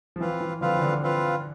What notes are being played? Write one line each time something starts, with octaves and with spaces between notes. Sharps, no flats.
F3
E3 C4 F4 B4 F5
E3
D3 F3 C4 F4 B4 F5
E3
D3
C4 F4 B4 F5